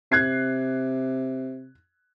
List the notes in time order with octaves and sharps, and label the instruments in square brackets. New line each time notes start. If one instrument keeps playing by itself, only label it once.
[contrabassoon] C3 [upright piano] F#6 G#6 C7